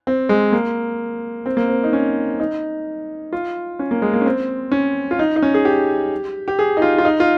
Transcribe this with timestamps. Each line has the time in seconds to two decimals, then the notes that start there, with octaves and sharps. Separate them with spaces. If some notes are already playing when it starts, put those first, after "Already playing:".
0.07 C4
0.29 G#3
0.53 A#3
1.46 C4
1.57 A#3
1.69 C4
1.84 D#4
1.93 C#4
2.40 D#4
3.33 F4
3.79 C#4
3.91 A#3
4.02 G#3
4.14 A#3
4.21 C#4
4.26 C4
4.72 C#4
5.11 F4
5.19 D#4
5.36 D#4
5.42 C#4
5.54 G#4
5.65 G4
6.48 G4
6.59 G#4
6.77 D#4
6.82 F4
6.98 F4
7.05 D#4
7.20 F4